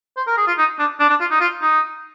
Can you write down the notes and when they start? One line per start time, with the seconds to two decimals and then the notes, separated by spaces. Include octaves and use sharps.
0.17 C5
0.27 A#4
0.37 G#4
0.47 F4
0.58 D#4
0.79 D4
1.00 D4
1.10 D4
1.20 F4
1.31 D#4
1.40 F4
1.61 D#4